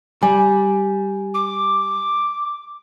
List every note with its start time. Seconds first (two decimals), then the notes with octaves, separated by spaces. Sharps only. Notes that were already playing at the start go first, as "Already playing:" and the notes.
0.23 G3 G#5
1.34 D6